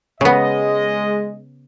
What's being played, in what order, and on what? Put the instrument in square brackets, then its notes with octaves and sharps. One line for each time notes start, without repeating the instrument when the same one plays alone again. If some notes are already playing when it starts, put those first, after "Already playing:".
[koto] C#3 B3 [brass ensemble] G#3 D#5